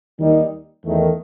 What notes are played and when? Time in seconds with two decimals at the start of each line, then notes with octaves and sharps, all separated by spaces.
0.20 D#2 D#3 G3 D#4
0.85 E2 D#3 A3